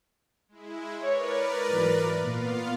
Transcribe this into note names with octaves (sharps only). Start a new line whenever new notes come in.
G#3 E4
A#4 B4 C#5 D5
G#2 E3 F#3
A#2 B3 F4 F5